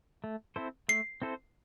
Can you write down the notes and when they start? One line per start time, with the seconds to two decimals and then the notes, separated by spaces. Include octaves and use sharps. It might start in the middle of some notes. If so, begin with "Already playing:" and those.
0.24 A3
0.56 C4 E4 A4 C5
0.88 A3 C7
1.22 C4 E4 A4 C5